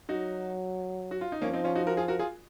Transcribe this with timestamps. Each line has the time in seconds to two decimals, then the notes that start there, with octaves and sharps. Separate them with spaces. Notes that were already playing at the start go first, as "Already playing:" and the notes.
0.08 F#3 D#4 F#4
1.11 F#4
1.21 F4
1.32 D#4
1.42 F3 A#3 C#4
1.53 C4 D#4
1.64 C#4 F4
1.75 D#4 F#4
1.87 F#4 A#4
1.97 F4 G#4
2.08 F#4 A#4
2.19 F4 G#4